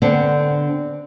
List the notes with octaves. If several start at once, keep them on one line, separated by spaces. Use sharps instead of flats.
D3 B3 C4 D4